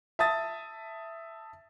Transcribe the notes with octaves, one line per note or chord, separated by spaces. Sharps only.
E5 A5 D#6 A6